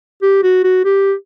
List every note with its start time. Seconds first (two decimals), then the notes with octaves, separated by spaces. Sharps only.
0.22 G4
0.43 F#4
0.64 F#4
0.85 G4